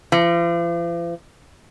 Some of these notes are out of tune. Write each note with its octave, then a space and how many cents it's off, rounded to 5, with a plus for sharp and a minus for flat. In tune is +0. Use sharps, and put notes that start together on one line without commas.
F3 -45